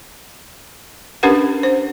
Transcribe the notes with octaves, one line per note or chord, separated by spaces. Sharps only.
C#4 D4 G4 A#4 B4 F#5
C5